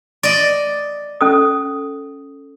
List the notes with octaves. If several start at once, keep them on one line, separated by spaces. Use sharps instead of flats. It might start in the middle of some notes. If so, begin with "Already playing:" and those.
D5 D#5
C#4 A4 D#6